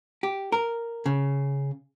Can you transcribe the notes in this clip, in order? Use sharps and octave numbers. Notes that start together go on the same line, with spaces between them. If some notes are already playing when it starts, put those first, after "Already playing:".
G4
A#4
C#3